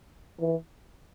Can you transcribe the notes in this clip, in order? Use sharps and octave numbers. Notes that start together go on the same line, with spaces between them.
E3